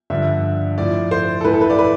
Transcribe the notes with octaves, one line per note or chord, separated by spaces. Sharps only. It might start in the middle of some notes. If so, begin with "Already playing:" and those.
G2 D3 F3 E5
A2 F3 D5
C5
A4
A2 E3 B4
A4
B4
D5
B4